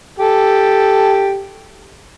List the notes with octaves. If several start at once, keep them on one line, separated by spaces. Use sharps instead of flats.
G4 A4